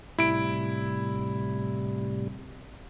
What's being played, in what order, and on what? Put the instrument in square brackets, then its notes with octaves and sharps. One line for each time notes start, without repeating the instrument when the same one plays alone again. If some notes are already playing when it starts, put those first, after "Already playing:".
[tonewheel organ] A2 C3 G3 [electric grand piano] E4 D7